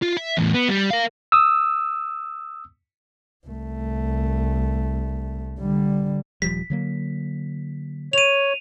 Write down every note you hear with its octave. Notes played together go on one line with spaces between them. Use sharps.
F4
E5
E2 A2
B3
G3
A#4 F5
D#6 E6
C2 A3
D3 G3
D#1 F3 G3 B6
D3 F#3 A#3
C#5 D#7 F7